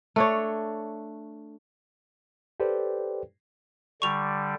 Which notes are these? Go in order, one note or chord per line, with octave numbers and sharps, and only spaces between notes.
A3 D4 C#5
G4 A4 B4 C5 D5 G5
D3 G3 C#6 F7